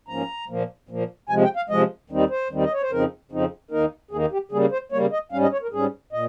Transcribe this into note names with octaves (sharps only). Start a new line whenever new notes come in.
G#2 F3 A#3 C#4 A#5
A#2 F3 A#3
A#2 F3 A#3
C3 F3 G#3 G#5
G5
F5
C3 F3 G#3 D#5
D#2 D#3 G3 C4 D#4
C5
D#2 D#3 G3 C4 D#4
D#5
C#5
C5
F2 C#3 F3 C4 D#4 A#4
F2 C#3 F3 C4 D#4
D#2 D#3 A#3 D#4 A#4
D#2 D#3 A#3 D#4 G#4
G4
C#3 G3 A#3 G#4
C5
C#3 G3 A#3 C#5
D#5
G#2 G3 C#4 F5
D#5
C#5
A#4
G#2 G3 C#4 G#4
A#2 D#5